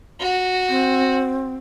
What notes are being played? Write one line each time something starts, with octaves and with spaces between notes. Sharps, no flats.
F#4
C4